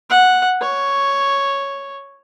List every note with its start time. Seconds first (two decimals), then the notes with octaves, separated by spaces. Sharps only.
0.10 F#5
0.61 C#5